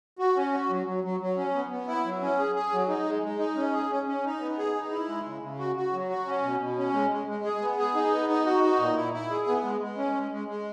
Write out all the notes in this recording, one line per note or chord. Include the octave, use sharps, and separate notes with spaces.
F#4
C#4
F#4
F#3
F#3
F#3
F#3
C#4
B3
B3
E4
F#3
C#4
G#4
G#4
F#3
D#4
G#3
G#3
D#4
C#4
G#4
C#4
C#4
D#4
B3
G#4
D#4
E4
G#3
C#3
C#3
F#4
F#4
F#3
F#4
C#4
B2
B2
C#4
G#3
G#3
G#3
G#4
B3
G#4
D#4
B3
D#4
F#4
D#4
A#2
E4
E4
G#4
B3
G#3
G#3
C#4
G#3
G#3
G#3